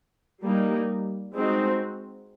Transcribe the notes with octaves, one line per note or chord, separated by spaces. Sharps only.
G3 A#3 D#4
G#3 C4 D#4 F#4